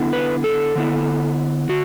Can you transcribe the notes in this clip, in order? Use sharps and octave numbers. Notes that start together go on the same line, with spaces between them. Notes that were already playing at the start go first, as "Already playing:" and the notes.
Already playing: D3 B3 E4
B4
A4
D3 B3 E4
D3 F#4